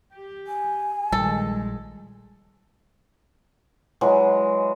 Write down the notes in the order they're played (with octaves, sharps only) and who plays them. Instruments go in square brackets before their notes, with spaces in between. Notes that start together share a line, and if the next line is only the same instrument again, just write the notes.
[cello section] G4
[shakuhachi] G#5
[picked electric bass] A#1 G3 [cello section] G#2 D#3 G#3 [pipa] A4
[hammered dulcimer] E3 F#3 G#3